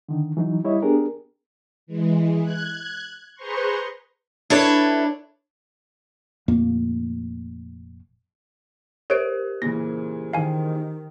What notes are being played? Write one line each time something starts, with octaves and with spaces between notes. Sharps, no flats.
D3 D#3
E3 F#3 D#4
G3 E4 C#5 D#5
B3 D4 G4 G#4 A#4
E3 G#3
F#6 G#6
G#4 B4 C5 A#5 C6 C#6
D4 E4 A4 B4 C#5
F1 F2 A#2 A#3
G4 A#4 C5 C#5 D7
A#2 C#3 E3 A#6
D#3 F5 G#5